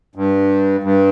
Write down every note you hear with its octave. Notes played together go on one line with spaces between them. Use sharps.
G2
G2